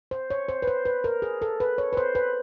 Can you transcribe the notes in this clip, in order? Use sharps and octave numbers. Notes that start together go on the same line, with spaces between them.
C5
C#5
C5
B4
C5
B4
A#4
G#4
A4
B4
C#5
B4
C5
B4